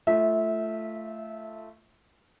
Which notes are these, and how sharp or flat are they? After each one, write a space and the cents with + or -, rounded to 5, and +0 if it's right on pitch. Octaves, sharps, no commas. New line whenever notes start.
A3 +0 F4 -30 E5 -20